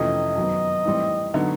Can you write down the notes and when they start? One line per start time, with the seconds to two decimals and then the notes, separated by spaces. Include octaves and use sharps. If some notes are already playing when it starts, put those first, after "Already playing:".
Already playing: F2 C3 E3 A3 C#4 D#5
0.36 F#2 D#3 F#3 B3
0.85 A2 E3 G3 C4
1.34 D3 F#3 B3 D#4